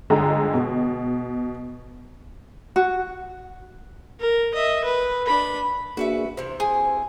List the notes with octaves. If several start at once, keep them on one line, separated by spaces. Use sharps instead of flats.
G1 D3 G#3 D#5 G5 A#5
B2
F#4
A#4
D#5 E5
B4
D4 B5
A#3 D4 F#4 G#4 B4 E5
C3 E3 C5
G#4